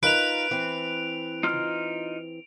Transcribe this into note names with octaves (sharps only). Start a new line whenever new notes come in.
D#4 F4 A#4 B4 D7 F7
E3 C4
D#4 F4 F6